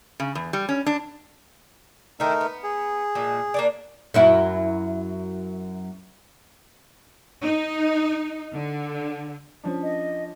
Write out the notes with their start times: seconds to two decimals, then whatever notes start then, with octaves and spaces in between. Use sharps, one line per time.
0.20 C#3
0.35 E2
0.53 G3
0.69 C#4
0.86 D4
2.20 D#3 A3 D#4 E4 A#4
2.41 B3
2.63 G#4
3.15 A#2 F3 G#3
3.54 A#3 D4 D5
4.14 F#2 F#3 E4
7.44 D#4
8.53 D3
9.64 F3 C#4 D4
9.83 D#5